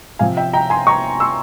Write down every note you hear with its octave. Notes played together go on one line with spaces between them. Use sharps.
C3 F3 C4 F5 G#5
E5 G5
G5 A#5
G#5 C6
A#5 C#6
C6 E6